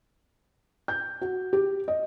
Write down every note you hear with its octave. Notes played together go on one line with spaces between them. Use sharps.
G6
F#4
G4
D#5